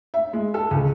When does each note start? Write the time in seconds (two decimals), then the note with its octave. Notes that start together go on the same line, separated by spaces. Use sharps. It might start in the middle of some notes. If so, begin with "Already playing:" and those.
0.14 E5
0.33 G#3
0.54 A4
0.71 C#2